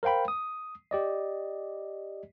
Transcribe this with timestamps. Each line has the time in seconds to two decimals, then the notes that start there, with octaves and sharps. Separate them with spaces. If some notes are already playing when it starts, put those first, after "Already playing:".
0.03 A#4 C5 F5 G5 B5
0.28 D#6
0.91 G4 D5 D#5